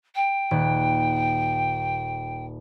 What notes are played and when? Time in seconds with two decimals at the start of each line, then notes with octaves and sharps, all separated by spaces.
0.15 G5
0.51 D#1 F#6